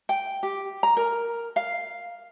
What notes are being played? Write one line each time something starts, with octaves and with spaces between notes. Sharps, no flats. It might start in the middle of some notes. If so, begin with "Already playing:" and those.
G5
G4
A#5
A#4
F5